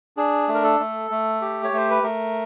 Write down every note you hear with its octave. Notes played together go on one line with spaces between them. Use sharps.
D4 G#4
A3
A#4
A4
A3
A3
G4
C#5
A3 C5
B4
A3 A#4